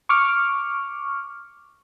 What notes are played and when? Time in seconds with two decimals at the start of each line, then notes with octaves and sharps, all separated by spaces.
0.09 C#6 D6 F6